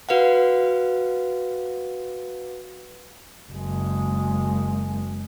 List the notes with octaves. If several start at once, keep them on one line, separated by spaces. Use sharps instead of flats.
F#4 B4 F5 F#5
F#1 G#3